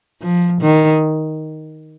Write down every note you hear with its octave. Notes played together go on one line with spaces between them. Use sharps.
F3
D#3